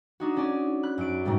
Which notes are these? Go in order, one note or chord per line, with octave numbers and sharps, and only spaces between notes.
D4 D#4 F#4
C#4 G#4 D5
B5 F#6
F#2 D7
G#2 B2 G3 A3